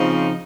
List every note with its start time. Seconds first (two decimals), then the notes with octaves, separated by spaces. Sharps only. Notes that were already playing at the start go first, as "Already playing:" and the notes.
Already playing: C#3 F3 C4 D#4